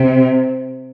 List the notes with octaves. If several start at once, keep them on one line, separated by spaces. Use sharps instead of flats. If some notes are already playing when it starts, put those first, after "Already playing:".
Already playing: C3